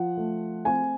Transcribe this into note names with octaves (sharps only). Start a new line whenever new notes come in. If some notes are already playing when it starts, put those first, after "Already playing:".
Already playing: F3 F#5
A3
C4 G#5